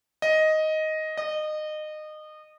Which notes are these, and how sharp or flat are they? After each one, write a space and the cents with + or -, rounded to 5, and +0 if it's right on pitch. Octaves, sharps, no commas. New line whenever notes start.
D#5 +5
D#5 -25